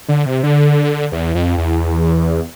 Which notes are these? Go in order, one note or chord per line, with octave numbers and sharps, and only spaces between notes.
D3
C3
D3
E2
F2
E2